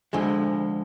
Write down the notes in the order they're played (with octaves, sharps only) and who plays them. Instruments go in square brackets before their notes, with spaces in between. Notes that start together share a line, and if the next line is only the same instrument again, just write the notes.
[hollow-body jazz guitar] D2 D3 F3 G#3